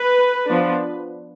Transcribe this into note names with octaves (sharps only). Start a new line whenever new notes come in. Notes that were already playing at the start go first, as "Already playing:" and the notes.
Already playing: B4
F3 B3 D4